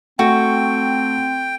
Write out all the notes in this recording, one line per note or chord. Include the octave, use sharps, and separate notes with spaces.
A3 C4 F#4 G5